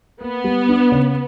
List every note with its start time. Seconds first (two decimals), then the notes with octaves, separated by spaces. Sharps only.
0.21 A#3 B3
0.44 G3
0.69 D4
0.92 C#3